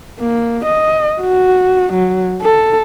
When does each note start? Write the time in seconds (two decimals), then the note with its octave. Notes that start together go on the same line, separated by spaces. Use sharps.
0.20 A#3
0.65 D#5
1.22 F#4
1.93 F#3
2.42 A4